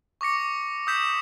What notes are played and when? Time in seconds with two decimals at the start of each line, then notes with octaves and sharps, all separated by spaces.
0.21 C#6 D6 A#6 C#7
0.87 D#6 E6 G6 B6 E7